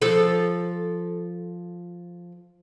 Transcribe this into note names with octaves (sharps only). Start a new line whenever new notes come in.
F3 A4